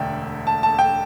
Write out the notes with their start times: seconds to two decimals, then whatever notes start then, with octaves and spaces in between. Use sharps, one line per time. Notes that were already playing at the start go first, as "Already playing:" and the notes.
Already playing: E1 D2 D3 D5 E5 G5
0.47 A5
0.63 A5
0.79 G5